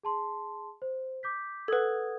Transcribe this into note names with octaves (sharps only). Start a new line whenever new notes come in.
G#4 A5 C6
C5
D6 G6 B6
A4 B4 F#5 D#6 G#6